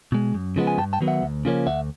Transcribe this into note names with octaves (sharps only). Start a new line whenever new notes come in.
B2 G#3
F#2
C#3 F3 G#3 B3
G#5
G2 G5 A5
G5 A5
D#3 F#3 B3
E5 F#5
D2
C#3 F3 A#3 C#4
D2 E5 F#5